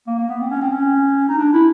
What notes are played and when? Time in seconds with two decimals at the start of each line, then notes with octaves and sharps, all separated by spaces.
0.07 A#3
0.18 A#3
0.29 B3
0.41 C4
0.51 C#4
0.61 C4
0.72 C#4
1.29 D#4
1.38 D4
1.53 E4